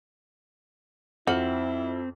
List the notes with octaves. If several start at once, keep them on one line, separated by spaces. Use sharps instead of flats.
F2 C4 E4 F#4 F6 F#7